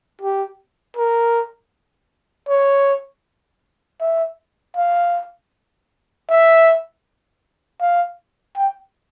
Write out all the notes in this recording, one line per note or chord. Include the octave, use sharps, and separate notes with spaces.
G4
A#4
C#5
E5
F5
E5
F5
G5